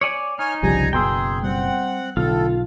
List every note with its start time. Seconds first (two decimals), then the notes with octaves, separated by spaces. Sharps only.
0.01 C#5 D5 G#5
0.39 D#4 C#5 G#5 F6
0.63 G1 C2 C#3 F3 G3 G#5 A#5
0.93 F#1 B2 G#4 G5 A#5 C6 E6
1.43 G3 C4 F#5
2.17 B1 A2 D3 F4 A4